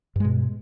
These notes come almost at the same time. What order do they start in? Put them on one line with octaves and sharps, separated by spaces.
G2 G#3 B2